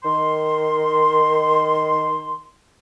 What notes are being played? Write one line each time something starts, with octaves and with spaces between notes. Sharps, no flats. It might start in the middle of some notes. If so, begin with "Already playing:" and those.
D#3 C6